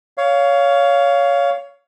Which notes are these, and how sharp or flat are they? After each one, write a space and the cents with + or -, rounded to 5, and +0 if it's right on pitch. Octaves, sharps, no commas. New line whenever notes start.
C#5 +20 F5 +0